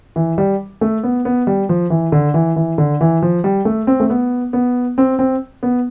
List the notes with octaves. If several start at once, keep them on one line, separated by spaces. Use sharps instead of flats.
E3
G3
A3
B3
B3
G3
F3
E3
D3
E3
E3
D3
E3
F3
G3
A3
C4
A3
B3
B3
C4
C4
B3